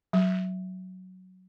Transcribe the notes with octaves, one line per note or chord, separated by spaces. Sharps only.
F#3